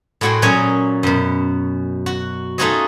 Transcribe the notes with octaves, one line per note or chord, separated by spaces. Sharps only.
A2 G#3 F#4 A4 G5 C6
A#2 F#3 C#4 G#4 D#5 G#5
F#2 B2
F#4
A3 D#4 F4 F#4 G#4 D#5